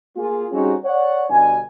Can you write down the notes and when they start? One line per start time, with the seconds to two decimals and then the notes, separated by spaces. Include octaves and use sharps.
0.17 A#3 F4 G#4
0.52 G3 C4 C#4 D#4 F#4 G#4
0.84 C#5 D5 F#5
1.30 G1 B2 D4 G#5